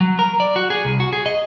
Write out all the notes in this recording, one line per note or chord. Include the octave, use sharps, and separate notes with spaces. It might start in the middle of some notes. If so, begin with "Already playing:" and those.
F#3
A#4
D5
F#4
G#4
C2
F#4
G#4
D#5